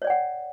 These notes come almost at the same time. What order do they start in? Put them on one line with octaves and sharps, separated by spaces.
C#5 D5 G5 F#5